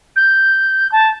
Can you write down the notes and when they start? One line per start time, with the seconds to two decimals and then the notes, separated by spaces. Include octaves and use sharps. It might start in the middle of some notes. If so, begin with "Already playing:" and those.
0.16 G6
0.92 A5